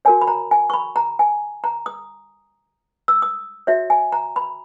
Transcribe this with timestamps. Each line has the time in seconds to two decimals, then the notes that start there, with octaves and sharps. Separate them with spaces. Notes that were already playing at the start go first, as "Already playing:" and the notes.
0.05 F#4 A#4 C#5 G#5
0.22 B5
0.28 A#5
0.51 G#5
0.70 C#6
0.74 B5
0.96 A#5
1.19 G#5
1.64 A#5
1.86 D#6
3.08 E6
3.22 D#6
3.67 F#4 C#5 E5
3.90 G#5
4.12 A#5
4.36 B5